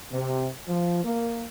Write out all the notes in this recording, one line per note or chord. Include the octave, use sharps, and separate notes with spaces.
C3
F3
A#3